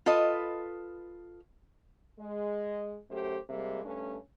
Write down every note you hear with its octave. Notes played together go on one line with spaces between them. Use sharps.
F4 A4 B4 D#5
G#3 D#5
F#2 A3 G4 C5
C3 G3 G#3 A#3
G2 A3 C#4